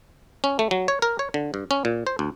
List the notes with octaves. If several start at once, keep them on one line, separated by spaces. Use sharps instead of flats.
C#4
A3
F#3
C#5
A#4
C#5
D3
G2
C#4
A#2
C5
D2